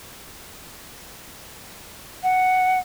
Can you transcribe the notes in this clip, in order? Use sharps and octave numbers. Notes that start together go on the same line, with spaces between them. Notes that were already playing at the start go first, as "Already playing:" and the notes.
F#5